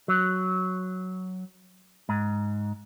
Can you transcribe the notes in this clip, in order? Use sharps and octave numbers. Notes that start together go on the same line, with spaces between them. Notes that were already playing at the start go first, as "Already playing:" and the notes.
F#3
G#2